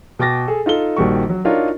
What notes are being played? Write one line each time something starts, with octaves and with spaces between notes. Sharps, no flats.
B2 G5 D6 A6 A#6
G#4 A4
D#4 F4 A4 G7
A#1 D#3 G3 F#4 C#6
F#3
D4 D#4 F4 F#4 A#4 C#5